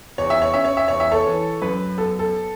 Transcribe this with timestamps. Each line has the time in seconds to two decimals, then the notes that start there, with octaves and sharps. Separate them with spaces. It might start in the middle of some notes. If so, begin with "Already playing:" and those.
0.18 E2 C#5
0.30 E5
0.42 C#5
0.53 C#4 E5
0.65 C#5
0.77 E5
0.88 E2 C#5
1.00 E5
1.12 A4 C#5
1.26 E3
1.62 F#2 B4
1.97 B3 A4
2.19 A4